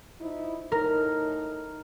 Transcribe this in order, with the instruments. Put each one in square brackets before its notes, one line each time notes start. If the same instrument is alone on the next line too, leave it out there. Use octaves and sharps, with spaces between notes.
[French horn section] F3 D#4 E4
[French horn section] A2 D#4 [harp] A#4